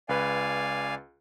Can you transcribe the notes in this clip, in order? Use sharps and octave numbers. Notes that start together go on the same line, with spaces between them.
C#2 B4 D5 F5 G#5